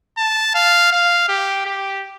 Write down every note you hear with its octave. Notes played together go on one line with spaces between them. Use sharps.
A5
F5
F5
G4
G4